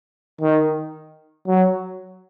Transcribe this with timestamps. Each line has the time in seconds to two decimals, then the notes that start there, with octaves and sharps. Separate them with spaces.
0.41 D#3
1.47 F#3